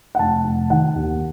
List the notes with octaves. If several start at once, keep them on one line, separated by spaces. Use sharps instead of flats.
F#5
F1 A5
F1
D#3 F#5
D#2